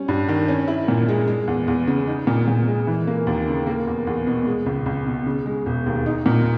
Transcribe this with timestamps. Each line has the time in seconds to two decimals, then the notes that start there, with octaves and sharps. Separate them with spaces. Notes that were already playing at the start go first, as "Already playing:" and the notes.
Already playing: G3 C#4
0.08 G2
0.28 D#3
0.48 C#4
0.68 E4
0.88 A#2
1.08 G#3
1.28 G#3
1.47 E2
1.68 E2
1.87 C#3
2.07 D#4
2.27 A#2
2.48 A#2
2.68 G#3
2.87 E3
3.07 A#3
3.27 D#2
3.48 C#3
3.67 A#3
3.87 E2
4.07 E2
4.27 B2
4.47 G#3
4.66 C#2
4.86 C#2
5.06 B2
5.26 C#3
5.46 G#3
5.66 E1
5.86 D#2
6.06 D#4
6.26 A#2